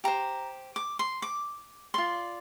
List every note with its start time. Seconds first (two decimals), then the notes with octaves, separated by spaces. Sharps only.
0.04 G4 C5 A#5
0.76 D6
0.99 C6
1.22 D6
1.94 F4 D5 C6